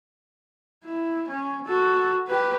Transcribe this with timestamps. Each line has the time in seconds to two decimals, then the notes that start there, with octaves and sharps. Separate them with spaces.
0.84 E4
1.28 C#4
1.67 F#4 A4
2.27 G4 B4